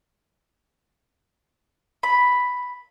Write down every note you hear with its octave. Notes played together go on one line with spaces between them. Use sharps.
B5